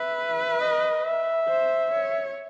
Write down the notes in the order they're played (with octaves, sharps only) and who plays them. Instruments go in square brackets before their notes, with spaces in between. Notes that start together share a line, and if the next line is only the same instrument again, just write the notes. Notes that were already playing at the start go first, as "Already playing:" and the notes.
Already playing: [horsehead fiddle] B4 [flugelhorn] E5
[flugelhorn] D#5
E5
[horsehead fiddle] C5
C#5